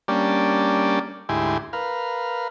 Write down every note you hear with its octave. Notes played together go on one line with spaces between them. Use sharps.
G3 A#3 C#4 D4 G4 D5
D2 G#2 E4 G4 G#5 C6
A#4 B4 F5